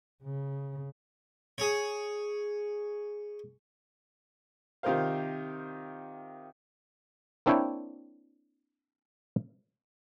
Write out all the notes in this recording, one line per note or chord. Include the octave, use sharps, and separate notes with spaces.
C#3
G#4 C#5
C3 D#3 F4 A#4 C5 F5
A#3 C4 D4 E4 C#5 G5